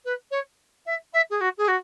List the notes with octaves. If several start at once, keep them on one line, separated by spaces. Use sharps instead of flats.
B4
C#5
E5
E5
G#4
F#4
G#4
F#4